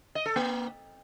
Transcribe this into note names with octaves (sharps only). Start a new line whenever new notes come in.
D#5
A4
A#3